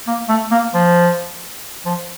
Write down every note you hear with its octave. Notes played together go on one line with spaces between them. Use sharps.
A#3
A3
A#3
F3
F3